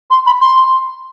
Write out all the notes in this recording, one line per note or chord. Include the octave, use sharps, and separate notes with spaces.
C6
B5
C6